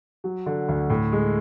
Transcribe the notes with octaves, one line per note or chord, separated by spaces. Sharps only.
F#3
D3
D2
A2
G#3